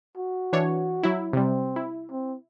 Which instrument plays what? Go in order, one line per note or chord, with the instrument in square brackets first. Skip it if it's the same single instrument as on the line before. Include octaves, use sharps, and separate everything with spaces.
[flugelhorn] F#4
[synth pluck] E3 D4 C#5
F#3 E4
[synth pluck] C3 G3 [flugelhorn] C4
[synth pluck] E4
[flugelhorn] C4